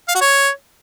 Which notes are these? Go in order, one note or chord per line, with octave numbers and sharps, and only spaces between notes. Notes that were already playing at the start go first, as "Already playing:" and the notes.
F5
F#4
C#5